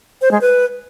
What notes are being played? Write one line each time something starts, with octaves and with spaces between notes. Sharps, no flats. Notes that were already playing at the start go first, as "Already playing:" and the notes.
C5
G#3
B4